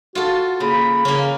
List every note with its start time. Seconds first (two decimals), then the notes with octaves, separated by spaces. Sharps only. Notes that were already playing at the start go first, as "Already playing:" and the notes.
0.15 F4 F#4 A4
0.60 C#3 A#3 B5
1.05 C#3 A#3 C#4